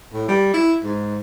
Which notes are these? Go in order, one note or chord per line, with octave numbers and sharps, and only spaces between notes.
A2
G3
E4
G#2